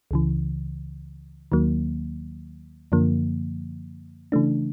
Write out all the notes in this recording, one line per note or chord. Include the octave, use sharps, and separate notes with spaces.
C#2 C#3 E3
D#2 D#3 F#3 A#3
F#2 D3 F3 A#3
C#3 E3 A3 D4